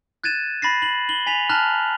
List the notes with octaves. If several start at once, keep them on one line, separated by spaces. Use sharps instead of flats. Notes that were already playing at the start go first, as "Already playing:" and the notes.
F#6 G#6 A6 D#7 E7
B5 A6 A#6 C7
F#7
F#7 G7
G#5 B6 F7
A5 A#5 F6 F#6